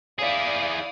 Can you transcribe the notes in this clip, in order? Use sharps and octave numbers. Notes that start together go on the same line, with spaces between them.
E4 G#4 D5 F5 D#6